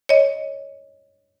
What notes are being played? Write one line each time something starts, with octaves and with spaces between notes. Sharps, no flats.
C#5 D#5